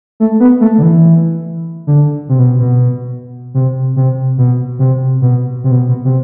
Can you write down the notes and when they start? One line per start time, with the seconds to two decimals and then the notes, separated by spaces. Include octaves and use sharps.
0.20 A3
0.40 B3
0.61 A3
0.78 D3
0.83 E3
1.87 D3
2.29 C3
2.39 B2
2.59 B2
3.54 C3
3.96 C3
4.38 B2
4.79 C3
5.21 B2
5.64 C3
5.71 B2
5.89 B2
6.05 C3